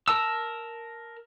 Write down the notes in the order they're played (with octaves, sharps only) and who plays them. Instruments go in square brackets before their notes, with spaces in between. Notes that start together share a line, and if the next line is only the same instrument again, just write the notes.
[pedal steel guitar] A#4 A5 E6